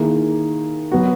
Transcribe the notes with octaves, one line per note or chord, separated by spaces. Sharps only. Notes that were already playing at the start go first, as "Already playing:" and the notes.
Already playing: D#3 A#3 E4 G#4
F#3 B3 F#4